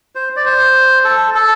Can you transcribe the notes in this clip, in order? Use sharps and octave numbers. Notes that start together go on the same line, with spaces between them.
C5
D5
C5
A4
A4